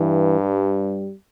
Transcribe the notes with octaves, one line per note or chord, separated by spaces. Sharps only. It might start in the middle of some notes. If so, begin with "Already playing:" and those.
Already playing: G2 E3
G3